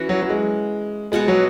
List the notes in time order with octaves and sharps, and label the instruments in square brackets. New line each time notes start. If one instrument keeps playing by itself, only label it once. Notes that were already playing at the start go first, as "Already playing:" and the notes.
Already playing: [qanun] E3 C#4 F#4 C#5
[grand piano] F#3
F#3
G#3
[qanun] B2 B3 F#4 C#5 [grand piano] G#3
[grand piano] F#3